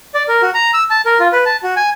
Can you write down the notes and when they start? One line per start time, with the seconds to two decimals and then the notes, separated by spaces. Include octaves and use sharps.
0.14 D5
0.28 A#4
0.42 F#4
0.54 A#5
0.74 E6
0.90 A5
1.06 A#4
1.19 F4
1.33 B4
1.46 A5
1.63 F#4
1.76 G#5